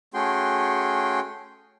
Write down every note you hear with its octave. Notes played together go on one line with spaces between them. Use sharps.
A3 C#4 F#4 G#4 G5 C6